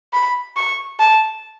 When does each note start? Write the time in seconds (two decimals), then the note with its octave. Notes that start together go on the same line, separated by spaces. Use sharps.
0.13 B5
0.57 C#6
1.00 A5